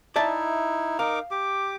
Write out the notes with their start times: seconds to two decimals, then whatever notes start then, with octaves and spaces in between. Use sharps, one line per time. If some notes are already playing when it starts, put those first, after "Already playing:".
0.16 D#4 E4 D5 E5 A5
0.99 D#4 A#4 F5 D6
1.31 G4 D6